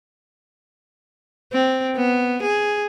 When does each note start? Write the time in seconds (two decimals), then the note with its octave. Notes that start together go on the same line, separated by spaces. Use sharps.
1.53 C4
1.96 B3
2.42 G#4